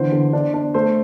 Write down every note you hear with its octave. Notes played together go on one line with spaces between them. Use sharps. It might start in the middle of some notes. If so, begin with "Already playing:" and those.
Already playing: D3 E3 C5
D3
D4
D4
A3 C5